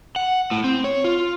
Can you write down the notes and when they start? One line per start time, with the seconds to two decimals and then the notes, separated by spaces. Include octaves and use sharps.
0.16 F#5
0.51 A2
0.64 C4
0.84 C#5
1.04 F4